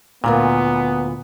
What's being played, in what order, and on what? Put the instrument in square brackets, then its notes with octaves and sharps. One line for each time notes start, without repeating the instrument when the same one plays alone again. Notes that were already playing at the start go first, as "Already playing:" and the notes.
[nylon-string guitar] D2 F4 A#4 [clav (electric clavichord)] A#2 [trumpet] B3